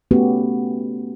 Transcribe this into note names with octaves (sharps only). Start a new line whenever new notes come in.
A3 B3 C#4 F#4 G4